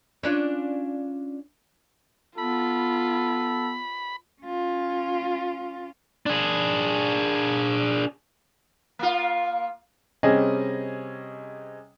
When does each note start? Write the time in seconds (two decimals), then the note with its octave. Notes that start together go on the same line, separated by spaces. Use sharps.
0.23 C#4 D4 F4
2.38 B3 F4 A4 B5
4.42 C#4 F4
6.26 D4 G#4
8.99 A#3 F4
10.23 C3 G3 C#4 G#4 D#5